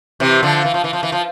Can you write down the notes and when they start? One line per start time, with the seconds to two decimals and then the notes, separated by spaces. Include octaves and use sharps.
0.20 C3 E3
0.43 D3 F3
0.65 E3
0.74 F3
0.84 E3
0.93 F3
1.03 E3
1.12 F3